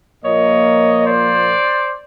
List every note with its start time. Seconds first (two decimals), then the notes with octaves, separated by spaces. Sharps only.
0.24 A#2 F3 A#3 C#5 D#5
1.05 C5 D5